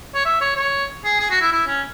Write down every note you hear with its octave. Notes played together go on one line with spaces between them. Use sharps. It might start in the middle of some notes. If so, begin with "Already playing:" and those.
C#5
E5
C#5
C#5
G#4
G#4
F#4
E4
E4
C#4